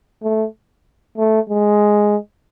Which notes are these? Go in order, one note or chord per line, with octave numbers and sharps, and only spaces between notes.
A3
A3
G#3